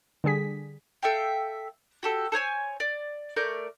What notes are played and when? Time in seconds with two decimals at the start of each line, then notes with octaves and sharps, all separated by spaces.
0.24 D3 G3 G#4 B6
1.02 A4 E5 F5 G5
2.03 F#4 G4 A4
2.32 A4 C5 C#5 G#5
2.80 D5
3.37 A3 A#4 D5 G6